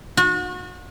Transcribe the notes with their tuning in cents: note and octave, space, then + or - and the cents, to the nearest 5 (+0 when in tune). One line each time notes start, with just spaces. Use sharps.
F#4 -35